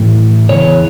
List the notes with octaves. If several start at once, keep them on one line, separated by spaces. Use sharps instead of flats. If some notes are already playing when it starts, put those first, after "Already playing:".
Already playing: A2 E3
E2 C#3 E3 C#5